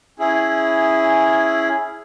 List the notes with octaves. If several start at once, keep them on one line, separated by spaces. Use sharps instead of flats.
C#4 E4 G#4